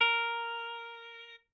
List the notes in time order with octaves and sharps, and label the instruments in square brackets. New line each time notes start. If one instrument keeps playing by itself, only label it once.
[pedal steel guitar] A#4